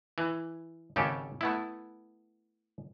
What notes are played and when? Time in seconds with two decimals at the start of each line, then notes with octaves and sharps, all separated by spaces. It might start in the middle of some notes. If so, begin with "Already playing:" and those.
0.18 E3
0.96 G#1 C#3 G4 A4
1.41 A3 B3 E4